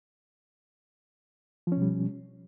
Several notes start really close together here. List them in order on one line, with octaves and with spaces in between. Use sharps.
F3 C#4 B2 G3